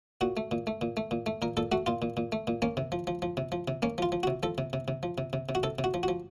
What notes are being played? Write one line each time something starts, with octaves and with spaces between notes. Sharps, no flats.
A#2 F#4
A3
A#2
A3
A#2
A3
A#2
A3
A#2 A#4
A#2 A4
A3 F#4
A#2 F4
A#2
A#2
A3
A#2
A#3 C#4
C3
F3
F3
F3
C3
F3
C3
A#3 C#4
F3 F4
F3
F#4
C3
F3 A4
C3
C3
C3
F3
C3
C3
C3
F#4
C3 A4
C3
F#4
F3
F#4
F3